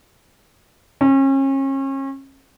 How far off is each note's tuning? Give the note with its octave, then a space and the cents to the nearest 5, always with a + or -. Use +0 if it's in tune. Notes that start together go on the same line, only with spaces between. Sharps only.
C#4 -35